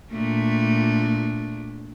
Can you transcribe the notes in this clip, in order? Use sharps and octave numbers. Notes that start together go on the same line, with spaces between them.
A#2 A3 D4